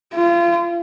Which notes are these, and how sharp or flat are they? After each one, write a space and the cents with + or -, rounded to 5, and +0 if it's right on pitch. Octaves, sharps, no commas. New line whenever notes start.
F4 -30